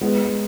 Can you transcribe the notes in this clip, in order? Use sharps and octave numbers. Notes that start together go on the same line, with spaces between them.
G#3 B3